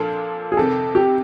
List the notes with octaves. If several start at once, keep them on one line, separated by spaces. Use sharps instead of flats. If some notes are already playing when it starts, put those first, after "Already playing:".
Already playing: A#2 F3 A#3 D4 F4 A4
G#4
F2 C3 D#3 A4
G4